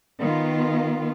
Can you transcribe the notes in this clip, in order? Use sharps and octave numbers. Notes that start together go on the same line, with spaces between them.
D#3 B3 F4